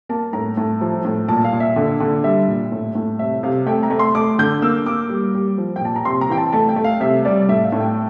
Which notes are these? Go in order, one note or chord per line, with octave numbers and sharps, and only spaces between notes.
A#3 A5
A2 A#5
A2
F3
A2
A#2 A5
F5
A#2
E5
D3
D3
G3 E5
A#2
A2
A2
C3 E5
C3 F5
A3 G5
A#5
A3
C6
A3 D6
D3 G6
A#3 E6
A#3 D6
G3
G3
F3
G5
A#2 A5
A#5
C3 C6
A#5
E3 G5
A5
A3 A5
G5
A3
F5
C3 E5
G3 D5
A2 E5
F5
A2
G5